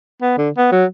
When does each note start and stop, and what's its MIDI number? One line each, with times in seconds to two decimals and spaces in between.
0.22 0.36 59
0.38 0.50 50
0.57 0.67 59
0.72 0.85 54